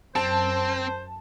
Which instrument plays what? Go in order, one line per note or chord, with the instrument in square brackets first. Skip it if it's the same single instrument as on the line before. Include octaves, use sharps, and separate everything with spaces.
[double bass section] F#2 [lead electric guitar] C4 [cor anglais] C5 [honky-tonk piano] A5